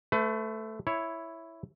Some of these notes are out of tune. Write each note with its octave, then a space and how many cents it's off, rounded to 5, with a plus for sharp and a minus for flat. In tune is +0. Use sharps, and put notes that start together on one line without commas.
A3 +0 B4 +40
E4 +0 C#5 +0